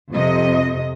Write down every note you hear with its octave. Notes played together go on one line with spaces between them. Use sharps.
F2 C3 D#5